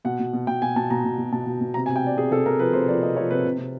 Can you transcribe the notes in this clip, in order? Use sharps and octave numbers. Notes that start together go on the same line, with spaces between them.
B2 F#5
B2
B2
B2 G5
B2 G#5
B2 A5
B2 A#5
B2
B2
B2 A5
B2
B2
C3 A#5
C3 G#5
G5
C3 D5
C3 G#4
C3 A4
C3 A#4
F3 B4
C3 C5
F3 D5
C3 D#5
F3 C#5
C3 B4
C3
C3